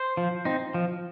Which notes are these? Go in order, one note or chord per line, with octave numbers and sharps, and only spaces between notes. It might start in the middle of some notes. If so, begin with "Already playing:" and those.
Already playing: C5
F3
C4 D#4
F3